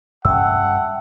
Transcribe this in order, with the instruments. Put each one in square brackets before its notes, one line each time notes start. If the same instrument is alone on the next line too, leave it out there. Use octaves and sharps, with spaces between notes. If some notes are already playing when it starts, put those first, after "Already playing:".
[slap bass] G2 C#4 [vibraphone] E5 G5 A5 [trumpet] F#5 [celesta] E6